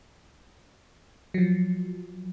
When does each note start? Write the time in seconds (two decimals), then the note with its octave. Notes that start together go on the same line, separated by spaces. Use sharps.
1.34 F3 F#3